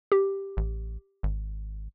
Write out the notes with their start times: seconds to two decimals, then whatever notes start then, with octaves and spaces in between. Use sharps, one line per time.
0.12 G4
0.57 A1
1.23 G#1